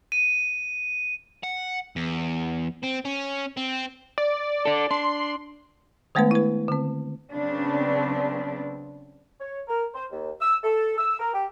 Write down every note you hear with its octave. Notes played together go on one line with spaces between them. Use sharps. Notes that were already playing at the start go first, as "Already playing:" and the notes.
D#7
F#5
E2
C4
C#4
C4
D5
D4 A4
D4 C6
D#3 G#3 A3 B3 D4 B4
E4 B4
D3 C4
C#3 F#3 B3 C4 D4
C#5
A#4
C5
D#2
E6
A4
E6
A#4
G4